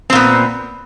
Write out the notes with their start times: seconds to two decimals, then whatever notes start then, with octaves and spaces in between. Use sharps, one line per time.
0.10 C4
0.13 A#2
0.15 B3